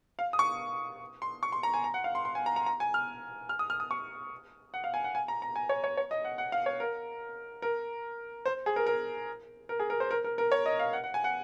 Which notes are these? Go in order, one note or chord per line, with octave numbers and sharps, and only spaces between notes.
F5
D#6
C#6
C6
C#6
C6
A#5
G#5
A#5
F#5
F5
C6
C6
G#5
A#5
A#5
A#5
G#5
F6
F6
D#6
F6
D#6
C#6
F#5
F5
G#5
F#5
G#5
A#5
A#5
G#5
C#5
C#5
C#5
D#5
F#5
F#5
F5
C#5
A#4
A#4
C5
G#4
A#4
A#4
A#4
G#4
A#4
C5
A#4
A#4
A#4
C#5
D#5
F5
F#5
F#5
G#5
F#5